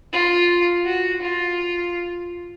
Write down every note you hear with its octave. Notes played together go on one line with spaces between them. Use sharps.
F4
F#4
F4